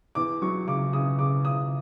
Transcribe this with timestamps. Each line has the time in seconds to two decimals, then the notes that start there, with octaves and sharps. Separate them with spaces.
0.15 E2 D6
0.42 F#3 C#6
0.67 C#3 D6
0.93 C#3 D#6
1.19 C#3 D6
1.45 C#3 D#6